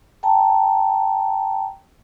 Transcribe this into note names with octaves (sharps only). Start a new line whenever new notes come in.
G5 A5 A#5